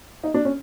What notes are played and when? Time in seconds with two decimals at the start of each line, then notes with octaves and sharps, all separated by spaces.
0.23 D#4
0.34 D4
0.45 C#4